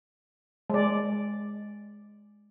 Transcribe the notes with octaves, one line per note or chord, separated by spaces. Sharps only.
G#3 D5